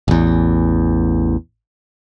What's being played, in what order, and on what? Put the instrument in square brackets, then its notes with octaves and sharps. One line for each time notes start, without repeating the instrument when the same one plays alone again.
[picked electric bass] A1 E2